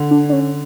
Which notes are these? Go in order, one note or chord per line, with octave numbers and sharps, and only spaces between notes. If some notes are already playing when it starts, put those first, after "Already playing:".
Already playing: D3
D4
D4
C#4